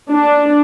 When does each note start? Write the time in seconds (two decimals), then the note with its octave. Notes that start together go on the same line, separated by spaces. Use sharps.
0.13 D4